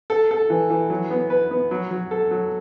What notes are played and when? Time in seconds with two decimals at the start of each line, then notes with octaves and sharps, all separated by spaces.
0.10 A4
0.31 A4
0.50 E3
0.70 E3
0.90 F#3
1.11 B3
1.30 B4
1.51 B3
1.71 F#3
1.91 F#3
2.11 A4
2.31 F#3